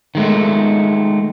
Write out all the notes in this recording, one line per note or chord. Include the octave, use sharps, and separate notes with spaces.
D#3 G#3 A3